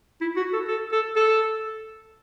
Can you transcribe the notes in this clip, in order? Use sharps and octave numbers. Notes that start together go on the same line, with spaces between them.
E4
F#4
A4
A4
A4
A4